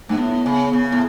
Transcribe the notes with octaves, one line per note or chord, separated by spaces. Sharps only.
G2 A3
A2 B3
C#3
C#3
A2